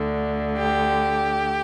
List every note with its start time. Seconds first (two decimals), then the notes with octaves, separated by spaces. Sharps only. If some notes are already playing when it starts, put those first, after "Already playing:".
Already playing: D2 D3
0.58 G4